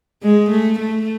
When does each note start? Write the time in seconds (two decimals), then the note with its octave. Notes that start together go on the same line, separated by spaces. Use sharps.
0.23 G#3
0.50 A3
0.80 A3